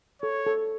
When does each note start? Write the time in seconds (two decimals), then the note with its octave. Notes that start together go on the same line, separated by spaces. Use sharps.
0.22 A4 C#5
0.46 A4